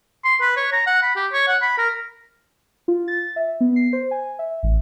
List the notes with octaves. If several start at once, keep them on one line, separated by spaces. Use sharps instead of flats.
C6
B4
C#5
A#5
F#5
B5
G4
C#5
F#5
B5
A#4
F4
A6
E5
B3
C7
C5
G#5
E5
A1